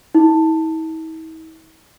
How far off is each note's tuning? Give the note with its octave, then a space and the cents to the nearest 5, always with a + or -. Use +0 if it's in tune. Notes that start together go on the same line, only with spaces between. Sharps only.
E4 -45